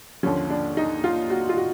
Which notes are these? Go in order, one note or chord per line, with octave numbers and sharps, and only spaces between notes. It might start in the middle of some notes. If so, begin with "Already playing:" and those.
D#2 D3 F3 C#4
D4
D#4
F4
F#4
F4
F#4